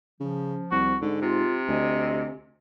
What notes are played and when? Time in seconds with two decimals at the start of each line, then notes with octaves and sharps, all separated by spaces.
0.20 C#3 F3
0.72 C2 F#4
1.02 G#2 D3
1.21 C3 F4
1.68 D2 D#5 G#5